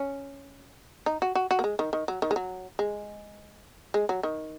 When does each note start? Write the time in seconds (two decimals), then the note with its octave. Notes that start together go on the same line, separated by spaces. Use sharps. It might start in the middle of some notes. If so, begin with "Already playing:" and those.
Already playing: C#4
1.06 D#4
1.22 F#4
1.35 F#4
1.51 F#4
1.59 A#3
1.64 G#3
1.79 D#3
1.93 D#3
2.08 F#3
2.22 D#3
2.31 G#3
2.36 F#3
2.79 G#3
3.94 G#3
4.09 F#3
4.23 D#3